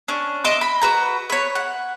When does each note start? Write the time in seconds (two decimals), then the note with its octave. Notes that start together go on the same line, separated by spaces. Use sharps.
0.08 C#4 D4
0.44 D#5 E5 C6 D6
0.61 B5
0.82 F#4 B4 A#5
1.30 B4 C#5
1.55 F#5